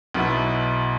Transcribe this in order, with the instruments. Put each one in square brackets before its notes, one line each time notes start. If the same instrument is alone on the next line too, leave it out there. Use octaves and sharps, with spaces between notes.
[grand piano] B1 B2 B3 E4